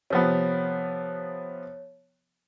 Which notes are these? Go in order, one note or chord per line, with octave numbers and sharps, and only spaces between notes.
C3 F3 B3 C#5